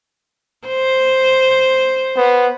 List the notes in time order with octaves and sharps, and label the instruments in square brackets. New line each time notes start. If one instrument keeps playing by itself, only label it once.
[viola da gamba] C5
[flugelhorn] B3